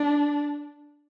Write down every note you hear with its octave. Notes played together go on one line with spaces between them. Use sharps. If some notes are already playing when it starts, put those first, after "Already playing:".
Already playing: D4